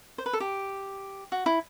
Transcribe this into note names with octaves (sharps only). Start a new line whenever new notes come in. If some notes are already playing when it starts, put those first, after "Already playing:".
C5
B4
A4
G4
F#4
E4